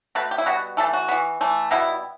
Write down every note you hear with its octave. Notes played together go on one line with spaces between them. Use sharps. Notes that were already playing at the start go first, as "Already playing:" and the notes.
B2 A3 B4
G4
E4
B2 G3 B3 F#4
E3 A3 A4
F#4
E3 B3
E3 A3
B2 G3 B3 E4